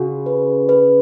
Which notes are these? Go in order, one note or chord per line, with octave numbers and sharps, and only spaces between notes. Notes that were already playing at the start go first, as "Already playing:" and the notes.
Already playing: C#3 F#4
B4
B4